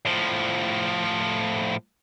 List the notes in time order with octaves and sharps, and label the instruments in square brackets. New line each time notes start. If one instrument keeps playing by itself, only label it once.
[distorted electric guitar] A2 F3